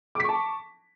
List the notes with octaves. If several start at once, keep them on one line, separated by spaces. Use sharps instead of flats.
A5 C#6 D6 B6